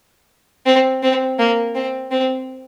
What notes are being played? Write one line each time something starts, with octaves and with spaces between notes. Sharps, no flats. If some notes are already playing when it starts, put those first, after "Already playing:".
C4
C4
A#3
C4
C4